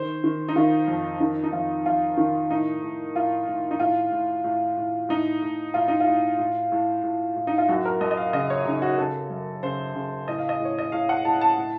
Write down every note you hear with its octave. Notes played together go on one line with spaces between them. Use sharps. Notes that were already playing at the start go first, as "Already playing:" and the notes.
Already playing: D#3 C5
D#3
D#4
D#3 F4
F2
D#3 D#4
D#4
F2 F4
F2 F4
D#3
A2 D#4
A2
A2 F4
A2
D#4
A2 F4
A2
A2
A2
A2 D#4
A2
A2 F4
D#4
F4
A2
A2
A2
A2
A2
D#4
F4
F#2 F#4
A#4
F#2 D#5
D#5
F5
C#3 D#5
C#5
C#3 D#4
F#4
C#3 A4
F#2
C#3 C5
C#3
A2 D#5
F5
D#5
A2 C#5
D#5
A2 F5
F#5
A2 A5
A5
A2